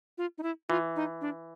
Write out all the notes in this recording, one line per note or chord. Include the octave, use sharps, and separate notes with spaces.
F4
D#4
E4
E3 F4
D#4
D4